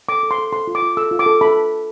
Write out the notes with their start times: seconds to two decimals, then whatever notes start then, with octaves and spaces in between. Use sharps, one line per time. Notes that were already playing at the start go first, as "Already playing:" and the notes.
0.09 A4 D6
0.23 A4
0.31 C6
0.38 A4
0.53 A4 C6
0.67 F4
0.75 D6
0.82 F4
0.97 A4 E6
1.11 F4
1.19 D6
1.26 A4
1.41 A4 B5